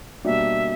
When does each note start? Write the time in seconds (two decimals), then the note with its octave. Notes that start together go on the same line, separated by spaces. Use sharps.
0.24 B2 G3 A#3 D4 E5